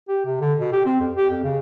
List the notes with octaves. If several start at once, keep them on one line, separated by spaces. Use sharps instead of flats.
G4
C3
D3
B2
G4
C4
F2
G4
F2
C#3